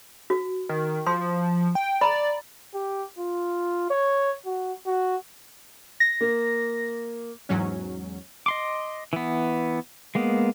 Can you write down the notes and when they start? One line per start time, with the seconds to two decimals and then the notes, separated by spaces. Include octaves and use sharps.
0.30 F#4
0.69 D#3
1.06 F3 C6
1.75 G5
2.01 D5 A#5 B5
2.74 G4
3.19 F4
3.90 C#5
4.46 F#4
4.87 F#4
6.00 A#6
6.21 A#3
7.49 E2 G#2 F#3 C#4
8.46 D#5 C6 D6
9.13 E3 B3
10.15 G#3 A#3 B3